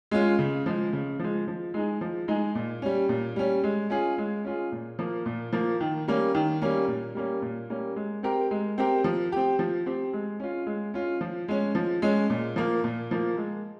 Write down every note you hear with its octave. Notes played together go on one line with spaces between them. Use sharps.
G#3 C#4 F4
C#3
F3 G#3
C#3
F3 G#3
F3
G#3 D#4 G#4
F3
G#3 D#4 G#4
A#2
G3 C#4
A#2
G3 C#4
G#3
C#4 F4 G#4
G#3
C#4 F4 G#4
A#2
F3 A#3
A#2
F3 A#3
D#3
G3 A#3 C#4
D#3
G3 A#3 C#4
A#2
G3 A#3 C#4
A#2
G3 A#3 C#4
G#3
C4 G4 A#4
G#3
C4 G4 A#4
F3
C4 G4
F3
C4 G4
G#3
C#4 F4
G#3
C#4 F4
F3
G#3 C#4
F3
G#3 C#4
A#2
F3 A#3
A#2
F3 A#3
G#3